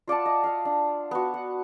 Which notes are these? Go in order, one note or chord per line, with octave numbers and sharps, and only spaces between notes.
F4 D5 F#5 A5
D#5
D#5 F5
D4
B3 F#4
F#5